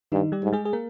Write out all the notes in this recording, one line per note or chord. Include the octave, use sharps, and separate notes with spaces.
G2 D#3 D#4
G3 G4
G#2
G#3 G#4
G#4
A#3 A#4